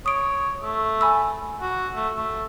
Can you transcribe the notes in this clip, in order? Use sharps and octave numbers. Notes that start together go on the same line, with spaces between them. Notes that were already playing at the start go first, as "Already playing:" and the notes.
C#5 D#6 D7
A3
G#5 B5 E6
F#4
A3
A3